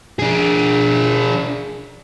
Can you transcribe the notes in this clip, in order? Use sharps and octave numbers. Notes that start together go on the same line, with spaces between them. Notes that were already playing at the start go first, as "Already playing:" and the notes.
D4 G#4